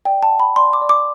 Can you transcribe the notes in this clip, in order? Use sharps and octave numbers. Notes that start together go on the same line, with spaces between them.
D5 G5
A5
F#5
B5
D5 C6
D6
D5
D6